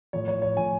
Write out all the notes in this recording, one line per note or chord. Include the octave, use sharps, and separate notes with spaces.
A2 F3 C#5
C#5
C#5
A2 F3 G#5